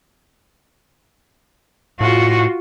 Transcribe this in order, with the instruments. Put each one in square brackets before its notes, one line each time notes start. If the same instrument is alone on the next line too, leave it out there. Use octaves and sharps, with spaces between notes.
[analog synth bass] A2 [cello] F4 F#4